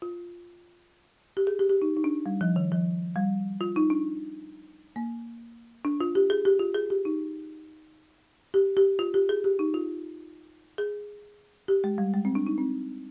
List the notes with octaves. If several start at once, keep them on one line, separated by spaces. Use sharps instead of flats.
F4
G4
G#4
G4
G4
D#4
D#4
D4
G3
F3
D#3
F3
G3
F4
D#4
D4
A#3
D4
F4
G4
G#4
G4
F4
G#4
G4
D#4
G4
G4
F4
G4
G#4
G4
D#4
F4
G#4
G4
G#3
G3
G#3
C4
D4
D#4
C4